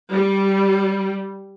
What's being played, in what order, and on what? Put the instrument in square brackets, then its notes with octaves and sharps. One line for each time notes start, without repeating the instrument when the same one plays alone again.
[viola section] G3